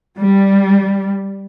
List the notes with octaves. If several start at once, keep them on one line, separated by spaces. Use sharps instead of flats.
G3